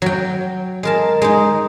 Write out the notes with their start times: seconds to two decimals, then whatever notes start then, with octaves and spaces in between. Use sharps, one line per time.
0.02 F#3 G5
0.83 G#3 A#4 A5
1.22 G#3 D#4